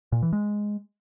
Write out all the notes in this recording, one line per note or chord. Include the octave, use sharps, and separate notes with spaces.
A#2
E3
G#3